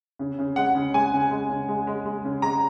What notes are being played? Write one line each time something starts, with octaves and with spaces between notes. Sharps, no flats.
C#3
C#3
G#3 F#5
C#3
G#3 G#5
C#3
G#3
C#3
G#3
G#3
G#3
C#3
G#3 A#5